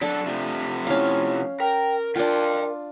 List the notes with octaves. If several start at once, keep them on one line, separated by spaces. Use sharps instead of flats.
F#3 D4 A4
C3 F3 A3
C#4 E4 F5
A#4 G5
D4 F4 A#4 F5 G5